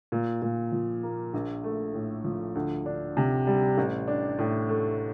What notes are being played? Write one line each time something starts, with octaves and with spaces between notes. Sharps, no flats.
A#2
A#2
F3
A#3
A#1
A3
A2
F3
D2
D4
C3
G3
A1
D4
A2
A3